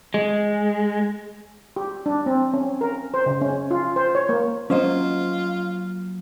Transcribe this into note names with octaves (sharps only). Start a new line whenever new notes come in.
G#3
G4
D4
C4
C#4
A#4
C5
C#3
C#4
F4
C5
C#5
A#3
F#3 A#3 C#4 F4 C5 D#5